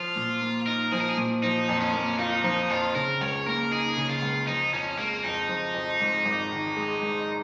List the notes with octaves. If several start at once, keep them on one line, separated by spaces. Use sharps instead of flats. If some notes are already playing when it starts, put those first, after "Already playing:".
Already playing: F3 F4
A#2
A#3
D#4 A#4
F3 G#4
A#4
G#4
A#2
F3 D#4
F2
C#4
A#3
D#4 F4
F3 D#4
F2 F4
C#3 A#4
C#2 C#5
A#3 A#4
D#4 G#4
C#3
F4
C#2
F3 D#4
F2 C#4
G#3 A#3
F2 D#4
F3
F2
G#2
G#1
D#3
G#3
G#2